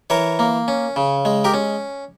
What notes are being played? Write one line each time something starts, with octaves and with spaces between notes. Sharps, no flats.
E3 A#4 C#5
A#3
C#4
C#3
G#3
G4 A#4
C#4